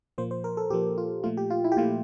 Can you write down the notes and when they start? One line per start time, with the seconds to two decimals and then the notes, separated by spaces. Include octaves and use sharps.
0.18 A#2 F3 A#3 C5
0.31 C5
0.44 A#4
0.57 A4
0.70 A#2 F3 A#3 G4
0.98 F4
1.24 A#2 F3 A3 F4
1.37 G4
1.50 F4
1.64 E4
1.72 G4
1.77 A#2 F3 A3 F4